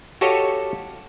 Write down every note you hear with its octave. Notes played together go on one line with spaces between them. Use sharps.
F#4 G4 A4 C#5 D#5 F5